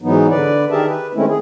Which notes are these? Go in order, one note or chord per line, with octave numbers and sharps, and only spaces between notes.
G#2 E3 F#3 B3 D#4
D3 B4 D5
D#3 G4 G#4 A#4 E5 A5
B4
D#3 G#3 A3 C4 C#4 E4
G#4